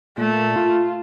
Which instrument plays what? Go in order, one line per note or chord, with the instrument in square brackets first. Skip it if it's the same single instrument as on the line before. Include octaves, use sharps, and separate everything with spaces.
[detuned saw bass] A#2 [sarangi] A3
[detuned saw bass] F4